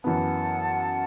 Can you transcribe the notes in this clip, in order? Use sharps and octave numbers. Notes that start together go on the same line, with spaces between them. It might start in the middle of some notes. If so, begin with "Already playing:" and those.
F#2 E3 B3 F#5 A5